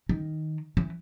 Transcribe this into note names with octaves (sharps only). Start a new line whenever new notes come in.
D#3
E3